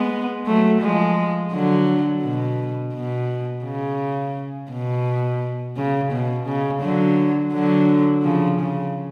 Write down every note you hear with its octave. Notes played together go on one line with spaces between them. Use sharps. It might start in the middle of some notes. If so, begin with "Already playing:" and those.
Already playing: G#3 B3
F#3 A3
F3 G#3
D3 F#3
B2
B2
C#3
B2
C#3
B2
C#3
D3 F#3
D3 F#3
C#3 F3
C#3